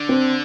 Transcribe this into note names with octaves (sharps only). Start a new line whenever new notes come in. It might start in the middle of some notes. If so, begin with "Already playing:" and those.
Already playing: D3
C4